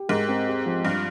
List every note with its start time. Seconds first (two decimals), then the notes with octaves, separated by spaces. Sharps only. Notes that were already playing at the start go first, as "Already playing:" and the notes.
Already playing: G4
0.09 G#2 A#4
0.28 C4
0.48 G4
0.66 F3
0.85 G2 F4